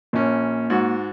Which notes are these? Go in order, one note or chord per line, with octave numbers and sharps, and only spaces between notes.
A#1 A#3 C#4
G#2 F#4